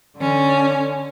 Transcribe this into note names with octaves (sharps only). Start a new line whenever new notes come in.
D3 C#4